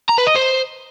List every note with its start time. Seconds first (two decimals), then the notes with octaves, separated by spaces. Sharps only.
0.09 A#5
0.18 B4
0.27 D#5
0.35 C5